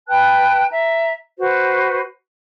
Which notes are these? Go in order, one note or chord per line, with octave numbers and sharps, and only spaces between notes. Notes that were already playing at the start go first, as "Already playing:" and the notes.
B4 G5 A5 F#6
E5 A#5
F#4 B4 C5